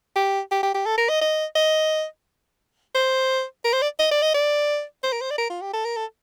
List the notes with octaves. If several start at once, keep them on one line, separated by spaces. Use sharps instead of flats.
G4
G4
G4
G4
A4
A#4
D#5
D#5
D#5
C5
A#4
C5
D5
D#5
D5
D#5
D5
C5
A#4
C5
D5
A#4
F4
G4
A4
A#4
A4